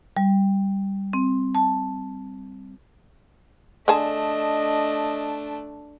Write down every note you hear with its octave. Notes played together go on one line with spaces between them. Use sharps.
G3
C4
A5
D3 A3 D4 G#4 D#5 A5